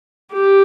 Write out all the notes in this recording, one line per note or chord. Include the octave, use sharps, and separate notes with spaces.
G4